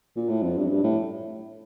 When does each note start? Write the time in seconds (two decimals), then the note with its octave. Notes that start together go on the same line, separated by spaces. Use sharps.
0.16 A#2
0.29 A2
0.43 F2
0.57 G2
0.65 F2
0.69 G2
0.84 A2